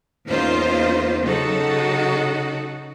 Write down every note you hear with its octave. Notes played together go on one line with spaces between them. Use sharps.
E2 A#3 C#4 D#4 F4 C5
C#3 F#3 D#4 F#4 A4